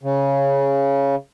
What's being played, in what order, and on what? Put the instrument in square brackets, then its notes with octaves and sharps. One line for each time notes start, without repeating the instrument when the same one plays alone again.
[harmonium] C#3